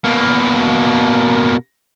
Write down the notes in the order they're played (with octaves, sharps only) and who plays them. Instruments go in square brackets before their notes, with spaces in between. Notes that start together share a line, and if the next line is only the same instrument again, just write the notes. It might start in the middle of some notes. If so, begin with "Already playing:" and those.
[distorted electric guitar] B2 A#3